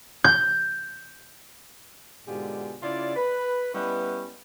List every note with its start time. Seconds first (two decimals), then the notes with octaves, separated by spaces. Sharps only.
0.24 G6
2.27 G#2 B2 D3 F4 G4 G#4
2.83 C#3 E4 F4 D5
3.16 B4
3.74 G3 B3 C#4 E4 B4 D#5